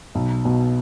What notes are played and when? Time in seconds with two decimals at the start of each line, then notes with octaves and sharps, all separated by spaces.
0.15 B1
0.45 B2